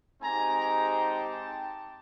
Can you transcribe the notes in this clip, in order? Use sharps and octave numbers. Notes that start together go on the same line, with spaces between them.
G#3 C4 D#4 G4 G#5 A#5
G#5 A#5
G5 A5